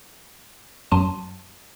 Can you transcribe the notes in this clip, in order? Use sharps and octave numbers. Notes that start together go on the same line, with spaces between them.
F#2 F#3 A5 C6 D#7